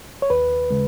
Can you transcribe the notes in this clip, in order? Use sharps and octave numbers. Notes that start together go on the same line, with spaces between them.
C#5
D#2 B4
C#3 G#3